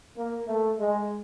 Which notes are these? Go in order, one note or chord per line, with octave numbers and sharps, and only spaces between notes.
A#3
A3
G#3